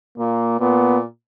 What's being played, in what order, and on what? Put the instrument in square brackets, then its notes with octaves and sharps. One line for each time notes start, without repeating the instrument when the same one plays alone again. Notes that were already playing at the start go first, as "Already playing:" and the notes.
[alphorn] A#2 [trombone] A#3
[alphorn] A#2 [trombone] B3